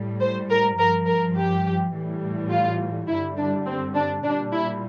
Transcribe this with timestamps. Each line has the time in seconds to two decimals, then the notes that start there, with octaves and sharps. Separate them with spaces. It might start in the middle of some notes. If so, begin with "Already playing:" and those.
Already playing: A2 G3
0.21 C5
0.51 A#4
0.79 G2 F3 A#4
1.07 A#4
1.37 G4
1.93 A2 E3 G3
2.51 F4
3.08 G2 D3 G3 E4
3.37 D4
3.66 C4
3.95 D4
4.24 A#2 G3 D4
4.53 E4